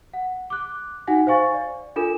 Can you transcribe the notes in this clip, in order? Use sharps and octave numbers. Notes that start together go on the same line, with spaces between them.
F#5
D6 F#6
D#4 F#4 F#5 G#5 A#6
C5 F5 G#5 C#6 A6
D5
D4 F4 A4 A#4 G#5 E7